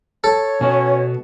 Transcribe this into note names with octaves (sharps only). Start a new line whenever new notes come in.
A4 C#5
B2 B3 C#4 F#4